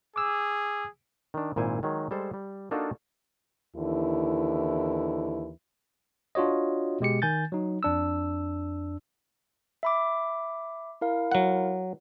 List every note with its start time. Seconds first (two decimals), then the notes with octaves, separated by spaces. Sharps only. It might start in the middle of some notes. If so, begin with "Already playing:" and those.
0.16 G#4 D6 E6
1.34 D#3 D4
1.56 G#1 A#2 E4 C5 G#5
1.83 D#3 F#3 G#3
2.11 G3 G#3 A4 C5
2.34 G3
2.71 A#3 D4 D#4 F4 F#4 A4
3.75 D#2 D3 E3 E4
6.35 D4 F4 F#4 C#5 D#5
7.00 B2 G#3 G4 C#7
7.22 D#3 G#5 G6 A6
7.52 F#3 D#4
7.83 F2 D4 E6
9.83 E5 B5 D6
11.01 E4 A#4 F5
11.32 F#3 F#5